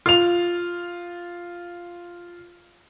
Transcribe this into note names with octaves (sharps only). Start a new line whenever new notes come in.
F4 F7